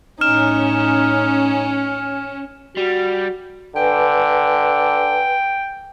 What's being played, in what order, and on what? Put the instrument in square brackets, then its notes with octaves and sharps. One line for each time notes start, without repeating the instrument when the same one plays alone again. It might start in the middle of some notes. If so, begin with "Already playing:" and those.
[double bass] A2 D#4 [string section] C#4 [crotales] F6 E7
[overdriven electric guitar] G3 [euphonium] F#4
[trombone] D3 [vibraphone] B4 G#5 [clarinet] G5